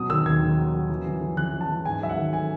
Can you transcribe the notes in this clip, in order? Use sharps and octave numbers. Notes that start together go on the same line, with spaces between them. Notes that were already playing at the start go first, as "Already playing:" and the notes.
Already playing: B2 F#3 D#6
D#3 E6
D#2 G#6
D#2
F#3
F#3
E3
E3
E3
E3 F#6
E3
A5
E3
G#2 G#5
F#3 E5
F#5
D#3
A3 G#5